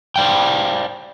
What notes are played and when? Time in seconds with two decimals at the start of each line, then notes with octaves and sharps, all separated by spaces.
0.16 C5 D5 F5 G5